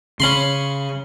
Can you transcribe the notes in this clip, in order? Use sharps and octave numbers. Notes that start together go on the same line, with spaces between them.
C#3 C#4 B5 C6